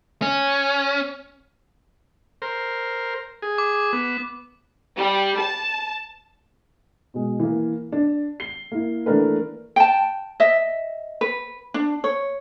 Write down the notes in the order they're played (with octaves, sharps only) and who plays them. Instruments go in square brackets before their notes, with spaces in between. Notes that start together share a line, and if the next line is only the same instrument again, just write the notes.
[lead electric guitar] C#4
[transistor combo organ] A#4 C5
G#4
[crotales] D6
[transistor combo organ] B3
[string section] G3
A5
[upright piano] B2 G#3
E3 A#3
D4
C7 G7
A#3 E4
E3 A3 A#3 D4 A#4 B4
[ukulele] G5 A5
D#5 E5
B4
D4
C#5